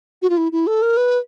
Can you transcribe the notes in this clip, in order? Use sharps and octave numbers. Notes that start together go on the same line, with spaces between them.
F#4
F4
E4
E4
A4
A#4
B4